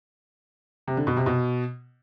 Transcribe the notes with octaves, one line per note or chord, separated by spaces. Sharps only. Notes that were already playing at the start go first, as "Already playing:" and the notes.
C3
D3
B2
C3
B2